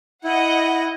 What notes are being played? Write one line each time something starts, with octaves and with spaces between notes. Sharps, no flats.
E4 D#5 F#5